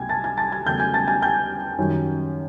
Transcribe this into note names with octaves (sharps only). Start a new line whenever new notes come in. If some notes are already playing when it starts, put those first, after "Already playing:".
Already playing: C2 B2 F#3 A3 G5 G#5 G#6
A5 A6
G#5 G#6
A5 A6
G#5 G#6
E2 C#3 F#3 A3 G5 G6
G#5 G#6
A5 A6
G#5 G#6
G5 G6
F#2 D#3 G3